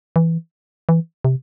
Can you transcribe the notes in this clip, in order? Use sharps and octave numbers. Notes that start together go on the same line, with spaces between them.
E3
E3
C3